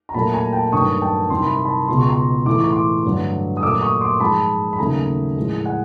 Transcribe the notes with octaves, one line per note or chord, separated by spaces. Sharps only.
A#5
A#2 F#3 A3 A5 B5
G#5 A#5
G5 A5
G2 D#3 F#3 A3 C#6 D#6
G5 A5
C2 C3 D#3 C6
B5
A#5
A5 B5
C#2 B2 G#3 C6
C#6
A#5 C6
A2 E3 A3 D6
C#6
C6 D6
G2 D3 F#3 A3
D#6
A#2 F#3 A3 D6 E6
C#6 D#6
C6 D6
G#2 F3 G#3 A5 B5
B5
D#2 C#3 F#3 A3 G#5 A#5
A2 F3 G#3
F#5 G#5